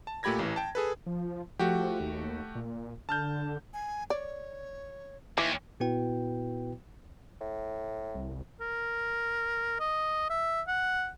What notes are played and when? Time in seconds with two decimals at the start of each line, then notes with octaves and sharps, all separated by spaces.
0.07 A5
0.23 A#2 A3 G4 B5 G#6 A#6
0.39 A1 E3
0.56 G5 A5
0.75 G#4 A4 B4
1.06 F3
1.59 F3 A3 F#4 G4
2.00 D#2
2.55 A#2
3.09 D3 A5 F6 G6
3.73 G#5
4.10 C#5 D5
5.38 D#2 E3
5.80 A#2 B3 E4 F#4 B4 G5
7.41 A2
8.15 C2
8.61 A#4
9.80 D#5
10.30 E5
10.68 F#5